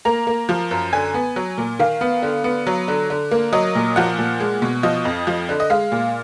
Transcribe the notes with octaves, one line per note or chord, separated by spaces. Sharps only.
A#3 A#5
A#3
F3
F#2
D3 G#5
B3
F#3
A#2
D#3 F5
B3
D3
B3
F#3
D3
D3
A#3
F#3 D#5
A#2
F3 F#5
A#2
G#3
B2
F3 D#5
F2
F3
D3
D#5
G#3 F5
A#2